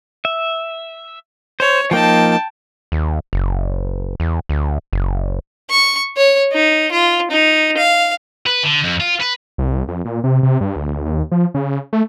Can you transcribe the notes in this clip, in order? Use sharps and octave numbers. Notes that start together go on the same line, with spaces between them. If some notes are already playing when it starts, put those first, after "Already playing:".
E5
C5 C#5
F3 A#3 D#4 G5 A5
D#2
F#1
E2
D2
F#1
C#6
C#5
D#4
F4
D#4
F5
B4
D3
F2
F4
B4
C2
F2
A#2
C3
C3
G2
D2
D#2
F3
C#3
A3